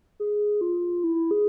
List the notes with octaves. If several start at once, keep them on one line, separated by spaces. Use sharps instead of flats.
G#4
F4
E4
G#4